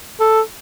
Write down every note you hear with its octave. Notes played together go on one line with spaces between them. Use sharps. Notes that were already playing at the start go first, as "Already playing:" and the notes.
A4